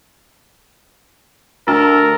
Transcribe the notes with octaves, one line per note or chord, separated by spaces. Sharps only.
D2 A4 A#4